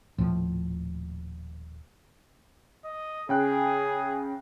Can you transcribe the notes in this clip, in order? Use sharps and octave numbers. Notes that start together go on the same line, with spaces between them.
D#1 A2 F3
D#5
C#3 G#4 G5 F#6